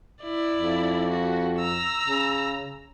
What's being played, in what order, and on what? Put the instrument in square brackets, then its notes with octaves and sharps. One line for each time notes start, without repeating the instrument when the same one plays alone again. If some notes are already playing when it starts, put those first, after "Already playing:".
[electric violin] E4 D5
[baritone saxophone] F2
[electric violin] F#4
A#5 E6
[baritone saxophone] C#3